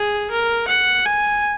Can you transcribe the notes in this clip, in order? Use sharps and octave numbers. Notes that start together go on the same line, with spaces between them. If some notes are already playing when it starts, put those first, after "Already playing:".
Already playing: G#4
A#4
F#5
G#5